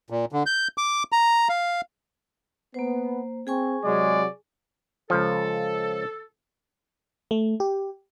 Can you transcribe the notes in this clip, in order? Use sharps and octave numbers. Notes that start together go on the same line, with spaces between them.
A#2
D3
G6
D6
A#5
F5
A#3 B3 C5
C4 G#4 G#5 C#6
C3 F#3 G#3 D5
C#2 F3 A4
A3
G4